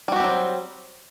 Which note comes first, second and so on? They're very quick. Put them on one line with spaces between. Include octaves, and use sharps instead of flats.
G3 F#4 G4 C4 F#3